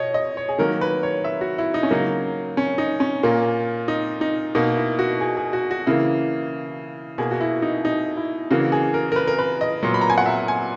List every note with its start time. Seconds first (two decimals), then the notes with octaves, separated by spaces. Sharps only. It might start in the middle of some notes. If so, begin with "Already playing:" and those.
Already playing: B2 C#5 D#5
0.14 D#5
0.37 C#5
0.49 G#4
0.58 D#3 F#3 A#3 A#4
0.81 B4
1.03 C#5
1.24 E5
1.41 F#4
1.58 E4
1.74 D#4
1.83 C#4
1.90 C#3 F#3 A#3 D#4
2.57 C#4
2.78 D#4
3.00 C#4
3.23 A#2 A#3
3.88 D#4
4.21 D#4
4.55 B2 A#3 D#4
4.76 E4
4.99 F#4
5.21 G#4
5.37 G#4
5.53 F#4
5.71 F#4
5.87 C#3 E3 A#3 E4
7.18 B2 A#3 G#4
7.31 F#4
7.41 E4
7.62 D#4
7.85 D#4
8.17 E4
8.51 C#3 E3 A#3 F#4
8.72 G#4
8.94 A#4
9.12 A#4
9.16 B4
9.27 A#4
9.39 B4
9.61 D#5
9.83 A#2 F#3 B3
9.94 B5
10.01 A#5
10.10 G#5
10.18 F#5
10.26 E5
10.48 G#5